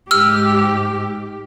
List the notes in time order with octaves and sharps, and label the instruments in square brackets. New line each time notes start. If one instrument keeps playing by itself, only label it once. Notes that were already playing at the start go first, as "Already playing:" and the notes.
[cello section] G#2 G4 [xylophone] E6 F6